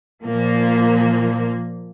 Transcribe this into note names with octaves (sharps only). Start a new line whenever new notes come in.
A#2 F3 A#3